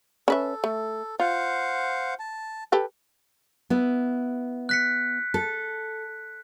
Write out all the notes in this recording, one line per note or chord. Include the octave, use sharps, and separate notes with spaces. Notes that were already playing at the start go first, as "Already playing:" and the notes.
C#4 A4 B4 E5
A3
F4 C5 F5 F#5
A5
G4 A4 B4
B3 E4
F#6 B6 C#7
A4